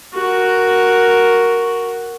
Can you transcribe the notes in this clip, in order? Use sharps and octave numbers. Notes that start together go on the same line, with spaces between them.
F#4 A#4